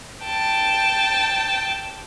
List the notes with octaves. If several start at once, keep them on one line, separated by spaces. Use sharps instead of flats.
G5 A5